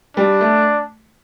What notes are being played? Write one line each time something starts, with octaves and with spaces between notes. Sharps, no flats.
G3 D4
A3